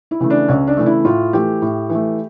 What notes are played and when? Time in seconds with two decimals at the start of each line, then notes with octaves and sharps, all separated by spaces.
0.11 E4
0.20 C#3 E3 A3
0.30 D4
0.48 C#2 C#4
0.67 D4
0.77 C#3 E3 A3
0.86 E4
1.05 A2 F4
1.33 E3 A3 G4
1.62 A2
1.89 E3 A3